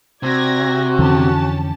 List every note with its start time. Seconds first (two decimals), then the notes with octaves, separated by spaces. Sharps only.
0.23 C3 F#4 D5 G#6 A#6
0.99 F2 D3 E3 C#4 G4 A5